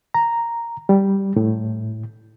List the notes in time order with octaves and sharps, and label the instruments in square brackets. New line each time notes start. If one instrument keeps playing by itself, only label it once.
[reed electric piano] A#5
G3
A2